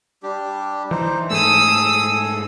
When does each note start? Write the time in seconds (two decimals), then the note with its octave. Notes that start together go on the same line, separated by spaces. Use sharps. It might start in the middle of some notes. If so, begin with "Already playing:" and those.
0.23 G3 D4 G4
0.91 E3 D#4 C5
1.30 G#2 A3 G#4 A4 D#6 E6